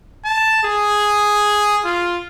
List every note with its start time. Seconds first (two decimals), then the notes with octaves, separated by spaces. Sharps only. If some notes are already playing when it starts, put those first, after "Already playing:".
0.25 A5
0.64 G#4
1.85 F4